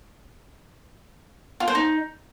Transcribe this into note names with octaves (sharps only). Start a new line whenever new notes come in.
F4
C5
D#4